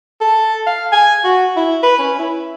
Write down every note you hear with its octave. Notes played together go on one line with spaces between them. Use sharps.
A4
F5
G#5
F#4
E4
B4
C#4
E4